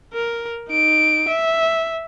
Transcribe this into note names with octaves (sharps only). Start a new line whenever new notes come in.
A#4
D#4 D7
E5